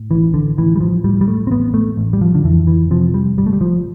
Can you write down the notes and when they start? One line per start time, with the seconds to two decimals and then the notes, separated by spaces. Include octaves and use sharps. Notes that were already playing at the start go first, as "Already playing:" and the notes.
Already playing: A2
0.11 A1 E3
0.34 D3
0.58 A1 E3
0.76 G3
0.80 F3
1.04 A2 G3
1.21 G3
1.28 A3
1.47 C4
1.51 A1 B3
1.74 A3
1.97 A1
2.13 G3
2.21 F3
2.35 D3
2.44 F2 E3
2.67 E3
2.91 C3 F3
3.14 G3
3.38 G1 G3
3.46 A3
3.53 G3
3.61 F3